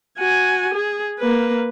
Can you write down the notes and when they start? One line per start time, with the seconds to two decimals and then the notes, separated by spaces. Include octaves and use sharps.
0.19 F#4 G#5
0.74 G#4
1.19 A#3 B4